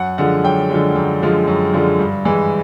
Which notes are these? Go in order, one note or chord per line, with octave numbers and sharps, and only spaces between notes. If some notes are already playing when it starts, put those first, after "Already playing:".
Already playing: F#2 F#5
D3 F3 G#3 F#5
F#2 G5
D3 F3 G#3
F#2
D3 F3 G#3
F#2
D3 F3 G#3
G2
E3 G#3